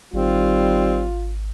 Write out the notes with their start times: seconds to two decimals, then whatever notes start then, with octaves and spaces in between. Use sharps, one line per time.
0.13 G#1 D#3 G3 C4 F4